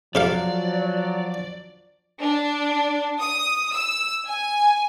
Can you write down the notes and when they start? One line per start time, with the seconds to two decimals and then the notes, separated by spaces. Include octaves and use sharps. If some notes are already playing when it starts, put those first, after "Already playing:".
0.15 C3 F3 F#3 G4 D5 F5
2.19 D4
3.20 D#6
3.73 E6
4.27 G#5